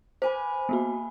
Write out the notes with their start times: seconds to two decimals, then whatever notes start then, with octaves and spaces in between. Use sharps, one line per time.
0.22 B4 C5 G#5 D6
0.69 A#3 B3 F#4